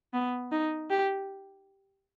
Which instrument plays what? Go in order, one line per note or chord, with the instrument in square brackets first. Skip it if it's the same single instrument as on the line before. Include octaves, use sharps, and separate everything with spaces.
[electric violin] B3
D#4
G4